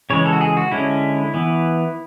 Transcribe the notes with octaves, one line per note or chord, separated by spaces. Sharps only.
C#3 E3 G#3 C#5
A4
F#4
G#4
F#4
D3 G#3 C#4 E4
E3 B3